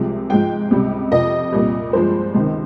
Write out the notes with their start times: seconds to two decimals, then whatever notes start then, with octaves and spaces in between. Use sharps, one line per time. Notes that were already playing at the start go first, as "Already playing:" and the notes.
Already playing: C2 C3 F3 G#3
0.30 G#2 F3 G#3 G5
0.71 C#2 C3 G3
1.12 F2 C3 F3 D#5
1.52 C2 A#2 G3
1.93 G2 F3 G#3 C5
2.34 C#2 C3 D#3